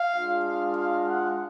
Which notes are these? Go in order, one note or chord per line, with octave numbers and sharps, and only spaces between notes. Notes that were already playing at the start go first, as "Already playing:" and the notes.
Already playing: F5
G#3 D4 F4
F5
F5
F#5